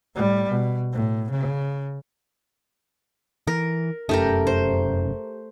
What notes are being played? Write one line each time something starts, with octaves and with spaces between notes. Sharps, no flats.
A2 G3
B2
A2
C#3
E3 A#4
F1 F#2 A3 C#4 G4 A#4
C5